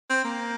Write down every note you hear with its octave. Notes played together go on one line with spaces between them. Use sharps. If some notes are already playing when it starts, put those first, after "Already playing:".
C4
A#3